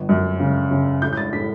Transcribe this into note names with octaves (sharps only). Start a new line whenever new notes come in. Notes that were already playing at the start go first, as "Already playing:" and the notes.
Already playing: G1
F#2
C#3
C#3
A2 G6
G6
A6
A2 B6